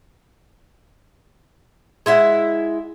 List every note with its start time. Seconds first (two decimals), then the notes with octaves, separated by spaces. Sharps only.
2.06 G#3 E4 E5 F#5